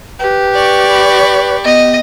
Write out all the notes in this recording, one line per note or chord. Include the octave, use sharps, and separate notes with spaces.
G4 B4
D5 C#6
B5
B3 D#5